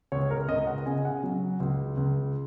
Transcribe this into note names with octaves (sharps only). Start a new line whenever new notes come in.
C#2 C#5
A#4
C#2 D#5
F#5
C#3 G#5
F#5
F#3
C#2
C#2